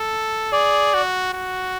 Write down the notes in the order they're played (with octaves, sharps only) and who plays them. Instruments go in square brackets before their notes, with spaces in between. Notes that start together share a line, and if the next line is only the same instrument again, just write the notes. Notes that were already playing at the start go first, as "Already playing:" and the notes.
Already playing: [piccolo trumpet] A4
[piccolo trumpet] G#4 [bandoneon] D5
[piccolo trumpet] F#4
F#4